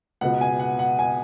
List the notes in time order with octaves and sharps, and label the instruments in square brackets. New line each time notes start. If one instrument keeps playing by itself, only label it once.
[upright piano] C#2 B2 F#5
G#5
F#5
F#5
G#5